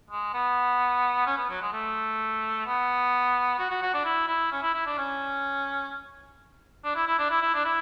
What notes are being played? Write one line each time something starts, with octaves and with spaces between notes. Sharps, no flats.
G#3
B3
C#4
B3
F#3
G#3
A3
B3
F#4
F#4
F#4
D4
E4
E4
C#4
E4
E4
D4
C#4
D4
E4
E4
D4
E4
E4
D4
E4